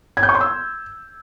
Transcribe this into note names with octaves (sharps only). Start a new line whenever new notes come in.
G#6
G6
C#6
C6
E6